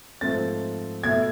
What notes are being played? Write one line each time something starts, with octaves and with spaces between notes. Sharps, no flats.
G#2 F3 A3 C4 A6
B2 A3 E4 G#6